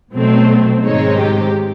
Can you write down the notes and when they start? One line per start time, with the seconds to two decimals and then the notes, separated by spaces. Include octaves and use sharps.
0.13 B2 F#3 A3 C4
0.83 G#2 D#3 G#3 C4 D#4 C#5
1.18 G4